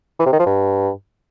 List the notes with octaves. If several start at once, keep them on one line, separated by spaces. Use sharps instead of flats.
E3
C3
D#3
F3
G2